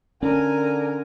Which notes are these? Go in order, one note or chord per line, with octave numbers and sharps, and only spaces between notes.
D3 C#4 A#4 G#5